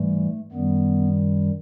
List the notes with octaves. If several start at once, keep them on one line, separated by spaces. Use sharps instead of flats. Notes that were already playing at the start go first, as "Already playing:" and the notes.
Already playing: G#2 E3 G3 A3
F#2 D#3 G3 B3